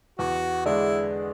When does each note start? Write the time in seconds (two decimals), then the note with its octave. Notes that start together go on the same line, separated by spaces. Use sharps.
0.19 E2 F#4
0.65 D3 G#3 D4 E4